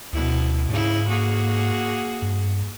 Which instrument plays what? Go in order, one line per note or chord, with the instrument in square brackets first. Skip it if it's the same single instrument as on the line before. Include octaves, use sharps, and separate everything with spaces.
[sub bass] D2 [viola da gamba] B2 E4
[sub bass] G#2 [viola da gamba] C#3 E4
[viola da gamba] A#3 F#4 G#4
[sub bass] G2